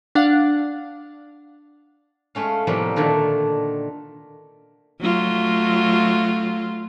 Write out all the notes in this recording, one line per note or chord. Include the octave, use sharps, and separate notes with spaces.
D4 F5 F#5
G#3 A3 C#4 F5
A2 C3 F3 G3 A#3 B3
A#2 D3 D#3 A3
F#3 A3 F4